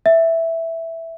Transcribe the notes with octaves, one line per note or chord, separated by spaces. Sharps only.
E5